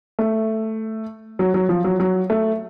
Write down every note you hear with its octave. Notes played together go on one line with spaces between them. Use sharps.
A3
F#3
F#3
F3
F#3
F#3
A3